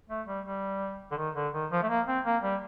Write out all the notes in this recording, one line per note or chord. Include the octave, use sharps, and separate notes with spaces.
A3
G3
G3
D3
D#3
D3
D#3
F3
A3
A#3
C4
A#3
G3